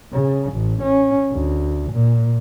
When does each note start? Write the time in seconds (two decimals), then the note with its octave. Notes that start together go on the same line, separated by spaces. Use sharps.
0.13 C#3
0.53 A1
0.82 C#4
1.32 D2
1.92 A#2